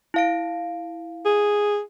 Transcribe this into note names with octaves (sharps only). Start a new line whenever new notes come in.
E4 F5 D7
G#4